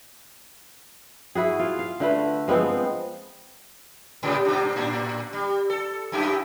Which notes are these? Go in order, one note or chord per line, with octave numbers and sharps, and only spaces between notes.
E4 F#4 G#4
F4
F5
D3 A3 B4
F3 G#3 B3 C4
G#2 C#3 G3
G2 C3 D4
A2 D4
G3
A4
F#2 E4 G4